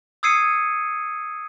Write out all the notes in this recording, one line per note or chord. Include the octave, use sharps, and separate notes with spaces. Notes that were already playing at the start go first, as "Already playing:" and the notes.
D#6 E6 G#6 C7 C#7 D#7